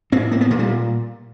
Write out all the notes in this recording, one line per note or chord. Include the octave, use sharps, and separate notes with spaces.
A2 C4
A#3
B3
A#2 A3
G3